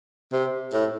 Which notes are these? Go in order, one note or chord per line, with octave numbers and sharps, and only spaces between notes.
C3
A2